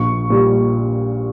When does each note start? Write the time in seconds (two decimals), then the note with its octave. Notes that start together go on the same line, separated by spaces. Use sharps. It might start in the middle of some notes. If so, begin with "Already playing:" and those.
Already playing: A#1 C#6
0.30 A#2 G3